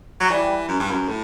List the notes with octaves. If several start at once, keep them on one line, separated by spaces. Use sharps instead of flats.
F#3
E3 G3
F#2
G2
F#2
A2